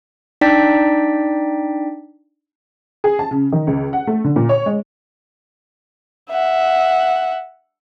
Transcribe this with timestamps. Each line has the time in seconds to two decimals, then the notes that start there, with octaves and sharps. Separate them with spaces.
0.41 D4 D#4 D5 G5 B6
3.04 G#4
3.19 A5
3.31 C#3
3.52 D#3
3.67 C#2
3.93 F#5
4.07 A3
4.24 D3
4.36 A#2
4.49 C#5
4.66 G#3
6.31 E5 F#5